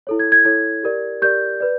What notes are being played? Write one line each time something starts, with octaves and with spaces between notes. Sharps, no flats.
E4 A4 C#5
G#6
G#6
E4 A4 C#5 G#6
G4 A#4 D5
G4 A#4 D5 G6
B4 D5